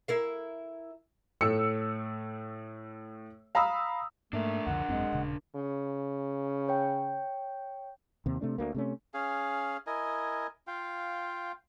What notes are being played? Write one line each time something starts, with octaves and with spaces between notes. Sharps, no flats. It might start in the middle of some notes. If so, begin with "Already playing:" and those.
E4 A#4 F5
A2 A3 E6 C#7
F5 A#5 B5 D#6 E6
G#2 A3 A#3 D4 A#4
C2 F2 D3 F#5
G#1 F#2 G#3 C4
D#1 C#3
C#3
C#5 G5
D#2 C3
C3 A3 D4
D2 A#3
C3 A3 C#4
C#4 G#4 F5
E4 A#4 D#5 G#5
F4 F5 G5